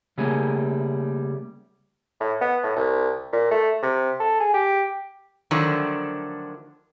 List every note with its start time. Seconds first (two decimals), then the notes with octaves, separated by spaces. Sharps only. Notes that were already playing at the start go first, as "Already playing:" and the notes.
0.18 C#3 G3 A3 A#3 G#4
2.20 A2
2.41 B3
2.63 A2
2.76 C2
3.33 A#2
3.51 A3
3.82 C3
4.20 A4
4.40 G#4
4.54 G4
5.51 D3 D#3 F3 F#3 A3 D4